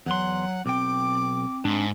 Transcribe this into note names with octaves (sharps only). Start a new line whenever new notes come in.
E2 F#3 F#5 C6
B1 C4 G5 D6
G#2 D4